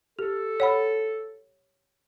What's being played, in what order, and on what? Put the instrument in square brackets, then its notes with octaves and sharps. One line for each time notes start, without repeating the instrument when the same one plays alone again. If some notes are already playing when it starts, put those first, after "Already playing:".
[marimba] G4 [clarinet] A4
[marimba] C#5 F#5 B5